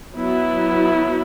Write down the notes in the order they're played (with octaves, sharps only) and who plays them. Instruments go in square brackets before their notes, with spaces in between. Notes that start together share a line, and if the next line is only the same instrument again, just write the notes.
[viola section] F#3 B3 E4